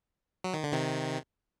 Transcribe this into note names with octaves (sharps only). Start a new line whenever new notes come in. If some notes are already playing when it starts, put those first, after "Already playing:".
F#3
D#3
D3
C3 D#3